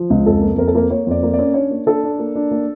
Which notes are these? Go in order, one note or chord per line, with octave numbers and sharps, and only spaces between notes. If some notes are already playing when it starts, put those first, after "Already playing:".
Already playing: F3
C#2
F2 A4
A#3
F2 A#4
A4
A#3 A#4
A#3 C#5
F2 D5
A#3
D5
C#4
D4 C#5
A#3
D4 A4
D4
A#3
D4
A#3